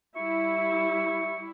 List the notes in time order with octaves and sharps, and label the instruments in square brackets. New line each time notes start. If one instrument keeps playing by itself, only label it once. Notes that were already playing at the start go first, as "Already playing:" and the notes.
[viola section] G3 E4 [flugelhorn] E5 [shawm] C#6